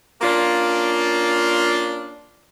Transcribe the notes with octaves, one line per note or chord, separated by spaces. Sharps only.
A#3 C#4 D4 F4